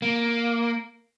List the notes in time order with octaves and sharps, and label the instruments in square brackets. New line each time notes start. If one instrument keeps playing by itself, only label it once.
[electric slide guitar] A#3